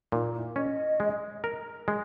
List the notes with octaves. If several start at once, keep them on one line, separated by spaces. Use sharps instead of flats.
A#2 D#4
E4
C#4 D#5
G#3
A#4
G#3